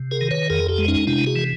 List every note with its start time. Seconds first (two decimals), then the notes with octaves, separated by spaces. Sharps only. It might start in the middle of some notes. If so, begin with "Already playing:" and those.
Already playing: C3
0.11 G#4 A#4
0.21 D#3
0.31 B4 C#5
0.50 F2 G#4 A#4
0.69 G4 A4
0.78 G#3
0.88 C#4 D#4
1.07 C3 D4 E4
1.26 F#4 G#4
1.36 E3